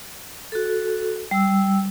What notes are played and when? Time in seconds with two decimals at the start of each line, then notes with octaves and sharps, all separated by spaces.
0.52 F#4 A4
1.31 G3 E6